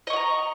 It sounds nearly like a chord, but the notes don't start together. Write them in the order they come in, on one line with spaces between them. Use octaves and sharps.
D#5 C#6 F#5 A#5